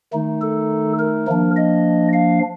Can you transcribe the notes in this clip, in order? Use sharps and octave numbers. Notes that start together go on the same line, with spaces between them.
D#3 A3 D#4
A4
A#4
F3 A#3 D4
D#5
F5